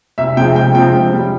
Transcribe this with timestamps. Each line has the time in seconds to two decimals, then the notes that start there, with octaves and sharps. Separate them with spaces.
0.18 C2 E5
0.37 C3 F3 G#3 C4 G5
0.56 C2 G5
0.75 C3 F3 G#3 C4 G5
0.94 C3
1.13 G3 C#4